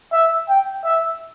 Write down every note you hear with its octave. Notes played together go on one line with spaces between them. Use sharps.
E5
G5
E5